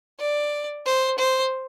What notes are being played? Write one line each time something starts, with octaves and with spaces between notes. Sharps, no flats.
D5
C5
C5